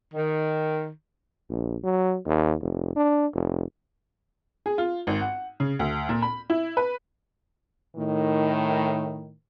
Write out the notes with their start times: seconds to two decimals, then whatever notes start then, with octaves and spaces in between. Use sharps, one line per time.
0.15 D#3
1.50 A#1
1.84 F#3
2.26 D#2
2.61 F1
2.96 D4
3.34 F1
4.66 G#4
4.78 F4
5.07 G#1
5.21 F#5
5.60 C#3
5.79 D2
6.09 A#2
6.22 B5
6.50 E4
6.77 B4
7.96 A2 D#3